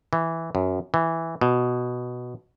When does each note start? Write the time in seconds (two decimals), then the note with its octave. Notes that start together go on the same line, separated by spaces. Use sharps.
0.13 E3
0.55 F#2
0.94 E3
1.41 B2